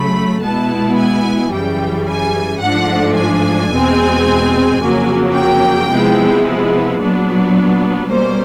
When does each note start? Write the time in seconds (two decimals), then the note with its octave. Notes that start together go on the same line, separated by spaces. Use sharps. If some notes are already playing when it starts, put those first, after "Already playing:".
Already playing: C#3 F#3 A3 B5
0.43 B2 G#3 B3 E4 A5
0.97 G#5
1.52 F#2 C#3 E3 G3 G5
2.07 G#5
2.61 G#2 F3 A3 D4 F#5
3.16 G#5
3.72 E2 B2 G#3 C4
4.80 F2 C#3 F#3 A#3
5.35 G5
5.90 C3 F3 G#3 B3 E4
7.00 A#2 F#3 B3 D4
8.09 B2 G3 A#3 C#4 C5